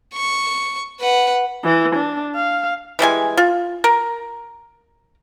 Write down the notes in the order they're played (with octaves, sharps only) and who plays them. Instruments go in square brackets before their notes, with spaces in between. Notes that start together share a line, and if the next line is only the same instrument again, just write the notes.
[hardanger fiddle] C#6
B4 F#5
[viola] E3
D4
F5
[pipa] E3 G3 G#3 G#5
F4
A#4